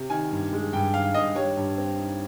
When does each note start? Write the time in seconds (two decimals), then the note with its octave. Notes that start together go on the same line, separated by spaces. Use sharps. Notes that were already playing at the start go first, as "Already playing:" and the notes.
Already playing: C3
0.10 D#3 G#5
0.31 G2
0.53 G#3
0.73 G2 G5
0.94 D#3 F5
1.14 G2 D#5
1.35 G3 C#5
1.57 G2
1.78 C4
1.99 D#4